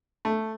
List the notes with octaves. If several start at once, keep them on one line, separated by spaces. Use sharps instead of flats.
A3